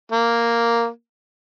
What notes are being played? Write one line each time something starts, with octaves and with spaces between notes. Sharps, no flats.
A#3